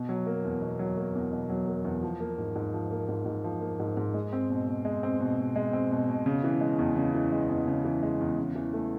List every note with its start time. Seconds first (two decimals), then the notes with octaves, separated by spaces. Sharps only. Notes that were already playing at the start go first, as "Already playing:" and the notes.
Already playing: B2
0.09 F#3
0.27 A#3
0.44 E2
0.62 B2
0.79 F#3
0.97 A#3
1.15 E2
1.32 B2
1.50 F#3
1.67 A#3
1.85 E2
2.03 F3
2.20 A#3
2.38 G#2
2.56 G#2
2.74 F3
2.91 A#3
3.09 G#2
3.26 G#2
3.44 F3
3.61 A#3
3.80 G#2
3.97 G#2
4.14 G#3
4.33 C4
4.50 B2
4.67 B2
4.85 G#3
5.03 C4
5.20 B2
5.38 B2
5.56 G#3
5.73 C4
5.91 B2
6.09 B2
6.26 C#3
6.44 E3
6.61 G#3
6.79 E2
6.96 C#3
7.15 E3
7.32 G#3
7.50 E2
7.67 C#3
7.85 E3
8.03 G#3
8.21 E2
8.38 C#3
8.55 E3
8.73 A3